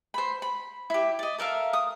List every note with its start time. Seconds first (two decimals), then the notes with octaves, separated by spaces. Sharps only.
0.14 C5 B5
0.42 B5
0.90 E4 G4
1.19 D5 D#5
1.38 A4 A#4 E5 F5
1.73 D#6